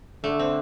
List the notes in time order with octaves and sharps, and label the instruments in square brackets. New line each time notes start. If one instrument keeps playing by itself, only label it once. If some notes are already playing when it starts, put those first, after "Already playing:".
[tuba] D3 [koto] A3
[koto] C4